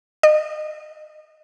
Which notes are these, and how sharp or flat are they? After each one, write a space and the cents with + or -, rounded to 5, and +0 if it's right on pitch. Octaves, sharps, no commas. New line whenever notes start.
D#5 -30